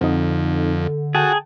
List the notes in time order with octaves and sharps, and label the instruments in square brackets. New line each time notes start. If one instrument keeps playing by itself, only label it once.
[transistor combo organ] F2 [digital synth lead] D3 [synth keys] C4 D#4
[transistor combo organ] F#4 [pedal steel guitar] G#4 [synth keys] G5 A5